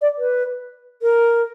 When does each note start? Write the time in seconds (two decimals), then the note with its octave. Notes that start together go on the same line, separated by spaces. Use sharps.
0.02 D5
0.18 B4
1.02 A#4